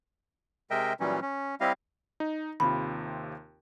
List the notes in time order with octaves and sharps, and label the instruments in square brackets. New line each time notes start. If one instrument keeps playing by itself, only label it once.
[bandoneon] C3 G#3 A#4 D#5 E5 G5
A#2 E3 F#3 G3 C#4
C#4
G3 C4 E4 G4 D#5 F5
[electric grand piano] D#4
[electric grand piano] D#2 C3 F4 [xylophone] B5